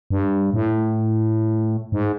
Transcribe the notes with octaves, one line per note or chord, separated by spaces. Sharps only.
G2
A2
G#2